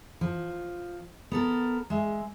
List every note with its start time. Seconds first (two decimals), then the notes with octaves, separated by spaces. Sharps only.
0.21 F3
1.32 B3 A4 A#4
1.90 G#3 E5